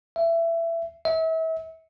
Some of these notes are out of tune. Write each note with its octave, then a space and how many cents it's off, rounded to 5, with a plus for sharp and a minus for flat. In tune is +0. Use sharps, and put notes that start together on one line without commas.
E5 +20
E5 -35